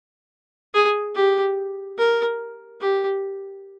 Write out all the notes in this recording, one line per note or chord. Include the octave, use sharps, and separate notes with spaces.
G#4
G4
A#4
G4